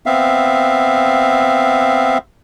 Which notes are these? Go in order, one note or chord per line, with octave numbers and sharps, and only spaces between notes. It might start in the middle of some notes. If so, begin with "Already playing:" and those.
B3 C4 E5 F5